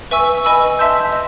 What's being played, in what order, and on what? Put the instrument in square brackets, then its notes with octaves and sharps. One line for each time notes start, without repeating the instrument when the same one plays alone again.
[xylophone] B4 E5 G#5 C#6 E6
B4 D#5 G#5 B5 E6
E5 A5 C6 E6 G6
D#5